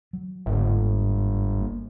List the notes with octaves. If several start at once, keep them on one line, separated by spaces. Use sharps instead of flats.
F#3
G1 G#2 A#3
A#3